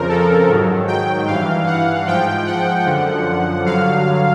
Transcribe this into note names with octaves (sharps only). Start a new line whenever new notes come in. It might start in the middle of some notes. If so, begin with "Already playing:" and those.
Already playing: F2 C#3 F3 A#4
A4
G#2 D#3 F#3
G5
G2 E3 F5
F#5
G#2 F3 G5
F#5
F#2 D3 F3
G2 D3 F#3 F5